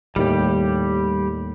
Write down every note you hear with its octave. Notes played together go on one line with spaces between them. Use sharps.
D#2 A2 G3 G4